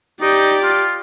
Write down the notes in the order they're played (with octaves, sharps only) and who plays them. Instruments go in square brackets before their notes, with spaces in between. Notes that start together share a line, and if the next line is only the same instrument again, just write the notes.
[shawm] D#4 [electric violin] G4 D5
[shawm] F4